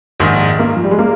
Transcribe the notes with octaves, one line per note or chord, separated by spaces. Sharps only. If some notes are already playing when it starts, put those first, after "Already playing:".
A#1 G#2 D#3
A#3
F3
G3
G#3
A#3